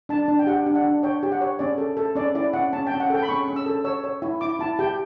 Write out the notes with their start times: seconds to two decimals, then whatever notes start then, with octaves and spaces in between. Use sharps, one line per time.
0.09 D4 A5
0.28 D4
0.39 G5
0.47 G4 F#5
0.66 D4
0.75 F#5
0.85 D4
1.03 C#5 G5
1.23 G4
1.32 F#5
1.41 C#5
1.59 C#4 D5
1.78 A4
1.97 A4
2.15 C#4 D5
2.35 E4 D5
2.53 C#4 F#5
2.73 C#4 A5
2.87 G5
2.91 C#4
3.00 F#5
3.10 A4 G5
3.23 B5
3.29 C#4 C#6
3.47 C#4
3.56 E6
3.66 A4
3.84 C#5 E6
4.04 C#5
4.22 E4
4.41 E4 D6
4.59 E4 A5
4.79 G4 G5